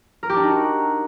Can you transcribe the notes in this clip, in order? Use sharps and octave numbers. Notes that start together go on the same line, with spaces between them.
A#4
G4
D4
D#4
F#4